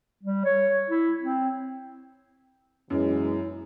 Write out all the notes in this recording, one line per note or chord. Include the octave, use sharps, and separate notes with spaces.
G3
C#5
E4
C4
F#2 B2 E3 G#3 E4